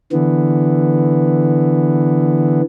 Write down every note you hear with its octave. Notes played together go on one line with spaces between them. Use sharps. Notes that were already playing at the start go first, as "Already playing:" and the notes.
D3 E3 B3